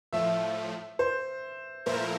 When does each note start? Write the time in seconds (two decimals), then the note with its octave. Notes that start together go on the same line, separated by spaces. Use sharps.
0.13 A2 F3 A3 E5
0.99 C5
1.86 A#2 F3 A3 E4 A#4 C5